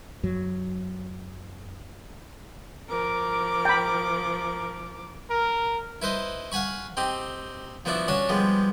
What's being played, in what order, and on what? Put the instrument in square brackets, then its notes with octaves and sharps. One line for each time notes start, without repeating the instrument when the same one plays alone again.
[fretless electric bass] F#2 F#3
[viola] F3 D6 [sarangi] A#4
[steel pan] G5 B5
[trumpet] A#4
[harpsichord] E4 B4 C5 D#5
F5 F#5 G#5 B5 C#6
C4 D#4 G4
F3 B3 D4 E4 F#4
C#4 D4 F#4 C#5 A5
F3 G3 G#3 B3